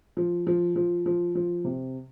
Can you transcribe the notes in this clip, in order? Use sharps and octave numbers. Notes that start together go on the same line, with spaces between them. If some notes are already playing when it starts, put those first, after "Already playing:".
F3
F3
F3
F3
F3
C3